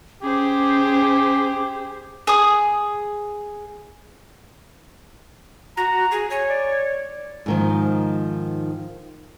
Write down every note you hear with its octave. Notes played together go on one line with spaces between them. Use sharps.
C#4 G4 G#4 C5 D6
G#4 D#6
F#4 A#5
G#4
C#5 G#5
D5
G#2 D#3 F3